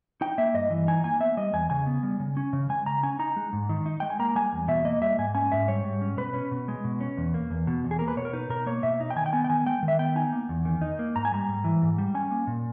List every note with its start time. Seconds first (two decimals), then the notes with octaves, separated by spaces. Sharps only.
0.21 D#4 G5
0.38 A#3 E5
0.54 G2 D#5
0.71 E3
0.88 D#4 G#5
1.04 A#3 G#5
1.20 B3 E5
1.37 G3 D#5
1.53 E2 G#5
1.70 C#3 G#5
1.86 B3
2.03 G3
2.20 C#3
2.37 C#4
2.53 C#3
2.69 G#3 G#5
2.86 C#3 A#5
3.03 C#4 G#5
3.19 D#4 A#5
3.36 G#3
3.53 G#2
3.69 D#3
3.86 D#4
4.00 G#3 G5
4.10 G#5
4.19 A#3 A#5
4.35 G3 G#5
4.53 E2
4.68 B2 E5
4.85 A#3 D#5
5.02 G3 E5
5.18 G#2 G#5
5.35 C#4 G#5
5.52 G#2 E5
5.68 G3 C#5
5.84 G#2
6.01 C#4
6.17 B2 B4
6.34 C#4
6.51 B2
6.68 G#3
6.84 B2
7.01 C#4
7.17 E2
7.34 A#3
7.51 E2
7.67 B2
7.84 E2
7.91 G#4
7.99 A#3 A#4
8.08 B4
8.17 B2 C#5
8.25 A#4
8.33 D#4 B4
8.49 B2 A#4
8.66 A#3 C#5
8.83 B2 E5
9.00 D#4
9.10 G5
9.16 D#3 G#5
9.26 G5
9.33 B3 G#5
9.44 G5
9.50 D#3 G#5
9.66 G#3 G5
9.83 D#3
9.88 E5
9.99 B3 G5
10.16 D#4 G#5
10.33 A#3
10.49 E2
10.65 D#3
10.81 D#4
10.99 A#3
11.16 G#2 A#5
11.25 G#5
11.32 G3 A#5
11.48 G#2
11.64 E3
11.82 G#2
11.98 G3
12.14 C#4 G#5
12.31 A#3
12.47 A#2